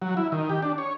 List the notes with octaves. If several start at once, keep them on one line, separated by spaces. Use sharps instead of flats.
F#3
E4
D#3
G4
D4
C#5